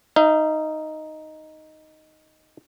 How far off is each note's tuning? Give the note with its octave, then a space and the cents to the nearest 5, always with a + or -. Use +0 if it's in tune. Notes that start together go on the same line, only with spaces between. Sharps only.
D#4 +0 E5 +45